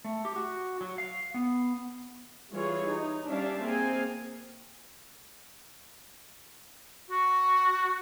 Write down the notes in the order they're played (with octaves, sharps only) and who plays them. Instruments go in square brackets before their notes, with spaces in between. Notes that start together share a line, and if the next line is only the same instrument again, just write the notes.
[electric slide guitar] A3
G4
F#4
F#3
F5
B3
[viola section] E3 G3 F4 G#4 C#5
D#4
G3 C#4 D4 E5 F5 A5
A#3 C4 G#4 F5 G#5
[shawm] F#4